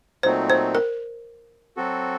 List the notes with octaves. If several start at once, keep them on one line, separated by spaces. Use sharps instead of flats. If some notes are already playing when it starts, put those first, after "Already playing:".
A#2 F#3 A3 C4 D#4 C5
C5
A#4
F#3 C4 F#4 A4